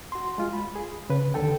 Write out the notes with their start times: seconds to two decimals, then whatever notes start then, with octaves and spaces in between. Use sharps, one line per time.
0.12 F#4 C6
0.38 G#3 F4
0.53 B5
0.75 G#4
1.10 C#3 B4
1.34 D#2 D3 A4 G5